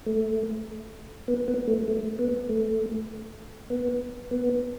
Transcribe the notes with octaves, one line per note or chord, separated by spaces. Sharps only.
A3
B3
B3
A3
A3
B3
A3
B3
B3